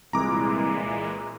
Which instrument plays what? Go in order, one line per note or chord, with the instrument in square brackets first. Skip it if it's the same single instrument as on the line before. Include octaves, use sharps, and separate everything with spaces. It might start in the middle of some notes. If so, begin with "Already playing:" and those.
[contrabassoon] C2 [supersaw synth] A#2 E3 G#3 [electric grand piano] A#5 D6